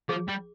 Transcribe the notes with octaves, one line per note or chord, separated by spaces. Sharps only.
F3 G#4
G3